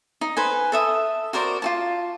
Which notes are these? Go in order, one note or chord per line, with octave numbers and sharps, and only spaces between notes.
D#4
B4 C5 G#5
A4 E5 D#6
F#4 A#4 C5 D5
F4 F#4 A5